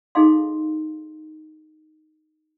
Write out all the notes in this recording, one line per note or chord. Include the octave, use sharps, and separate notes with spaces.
D#4 G#4 A4 D#5 F5 C6